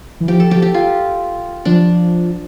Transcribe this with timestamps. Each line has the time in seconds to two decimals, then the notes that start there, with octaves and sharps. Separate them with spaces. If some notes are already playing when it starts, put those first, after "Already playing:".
0.20 E3
0.28 F3 G4
0.40 A4
0.51 F3 G4
0.62 G4
0.74 F4
1.65 F3 D4